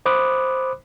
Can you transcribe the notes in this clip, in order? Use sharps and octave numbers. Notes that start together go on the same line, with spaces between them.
C5 B5 D6 D#6 F#6